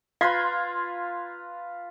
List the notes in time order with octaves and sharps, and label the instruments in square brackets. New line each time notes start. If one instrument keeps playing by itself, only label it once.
[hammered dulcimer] F4 B4 A#5 [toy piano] F5 [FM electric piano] C6 G#6